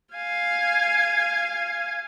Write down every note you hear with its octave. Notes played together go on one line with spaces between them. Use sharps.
F5 G#5